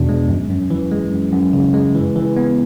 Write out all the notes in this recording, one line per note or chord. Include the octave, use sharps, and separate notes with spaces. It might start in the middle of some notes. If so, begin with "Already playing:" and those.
Already playing: E2 B2 B3 D4
G#3
F#2
F#2
E3
G#3
F#2
F#2
C#3
G#3
E3
E3
B3